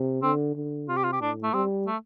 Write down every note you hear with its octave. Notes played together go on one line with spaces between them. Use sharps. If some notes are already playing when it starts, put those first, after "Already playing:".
Already playing: C3
D3 C4
D3
C3 F4
G4
F4
G4
A2 D4
A3
G3 C4
A3